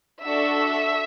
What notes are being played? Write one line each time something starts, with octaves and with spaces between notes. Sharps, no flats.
D4 F#4 A4 E5